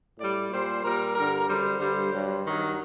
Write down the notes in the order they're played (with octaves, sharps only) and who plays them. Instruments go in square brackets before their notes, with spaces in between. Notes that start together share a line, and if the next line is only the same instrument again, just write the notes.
[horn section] A2 G3 D5
A#2 G3 C5
A#2 G3 A#4
G2 D3 G3 A#4
F#2 D3 G3 C5
G2 D3 G3
G2 F#3
G2 D#3 F#3